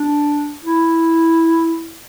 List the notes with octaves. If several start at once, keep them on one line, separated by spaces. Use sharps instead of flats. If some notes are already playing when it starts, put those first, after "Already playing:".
Already playing: D4
E4